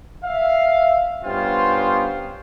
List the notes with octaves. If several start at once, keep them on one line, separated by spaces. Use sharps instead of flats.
E5 F5
G2 B3 C#4 F4 C5 G5